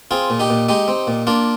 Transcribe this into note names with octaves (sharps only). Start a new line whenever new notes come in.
C4 F4 G#4
A#2
D#4 G4
A#2
G#3 D#4 G4
C4
A#2
A#3 D4 F4